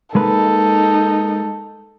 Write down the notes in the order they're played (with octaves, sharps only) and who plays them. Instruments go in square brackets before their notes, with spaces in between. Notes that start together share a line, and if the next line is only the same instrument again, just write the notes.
[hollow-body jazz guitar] G#3 A#3 B4 [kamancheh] D#4 A4